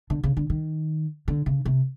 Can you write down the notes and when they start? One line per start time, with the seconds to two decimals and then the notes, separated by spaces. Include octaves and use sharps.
0.10 D3
0.24 C#3
0.37 D3
0.50 D#3
1.28 D3
1.46 C#3
1.65 C3